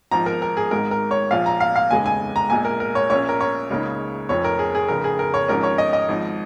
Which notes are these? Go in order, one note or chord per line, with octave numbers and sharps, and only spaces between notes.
G#1 G#2 F3 A#5
A#4
A#4
G#4
G#1 G#2 G#3 A#4
A#4
C#5
A#1 A#2 F3 F5
A#5
F5
F5
F1 D#2 C#3 G#3 G#5
G#5
A#5
A#1 A#2 G#3 G#5
A#4
A#4
C#5
A#1 A#2 A#3 C#4 C#5
A#4
C#5
C#2 C#3 A#3 D#4
F1 F2 F3 C#5
A#4
G#4
G#4
F1 F2 C#3 A#4
G#4
A#4
C#5
G#1 G#2 F3 C#4 A#4
C#5
D#5
D#5
G#1 G#2 F3